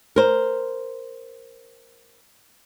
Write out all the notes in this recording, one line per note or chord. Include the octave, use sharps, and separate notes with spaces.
A#4 C5